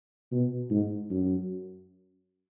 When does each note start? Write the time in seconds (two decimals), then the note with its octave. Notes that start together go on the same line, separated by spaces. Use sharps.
0.32 B2
0.70 G#2
1.10 F#2